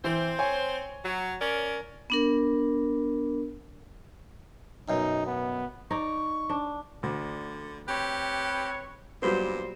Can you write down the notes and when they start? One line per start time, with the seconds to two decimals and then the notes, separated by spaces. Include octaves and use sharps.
0.04 E3 C4 C5
0.39 C#5 G#5
1.05 F#3
1.41 C#4 A#4 D5
2.10 B3 D4 A#4
4.89 F#2 B2 D#4
5.26 B3
5.91 D#4 D5 C#6
6.49 D4
7.03 D2 D3
7.88 C4 G4 B4 C#5
9.22 G2 A#2 F#3 G3 B3 C5